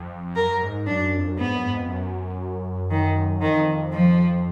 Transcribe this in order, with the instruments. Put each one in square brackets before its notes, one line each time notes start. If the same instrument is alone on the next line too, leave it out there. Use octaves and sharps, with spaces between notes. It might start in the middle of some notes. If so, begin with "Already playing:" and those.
Already playing: [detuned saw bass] F2
[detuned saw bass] F#2 [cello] A#4
[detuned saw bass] G#2
[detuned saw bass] F#2 [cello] D4
[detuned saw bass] F2
F#2
[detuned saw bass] G#2 [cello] B3
[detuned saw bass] F#2
G#2
F2
F#2
[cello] D#3
[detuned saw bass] F2 [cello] D#3
[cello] F3